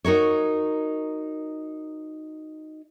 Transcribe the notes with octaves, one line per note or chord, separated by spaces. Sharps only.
D#4 F#4 A#4 C#5